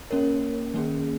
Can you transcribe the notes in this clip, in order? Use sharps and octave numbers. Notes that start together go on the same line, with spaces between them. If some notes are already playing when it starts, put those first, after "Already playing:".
A#3 C#4 A#4 C#5
D#3 A#3 C#4 G#4